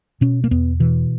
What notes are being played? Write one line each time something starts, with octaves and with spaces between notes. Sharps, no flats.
B2 C#4
A#3
E2 B3
B2 E3